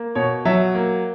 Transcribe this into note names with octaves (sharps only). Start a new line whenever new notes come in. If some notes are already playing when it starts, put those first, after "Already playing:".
Already playing: A#3
B2 C#5
F#3 E5
A#3